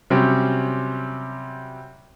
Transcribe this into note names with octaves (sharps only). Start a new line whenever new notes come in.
C3 F#3 G3 C4 C#4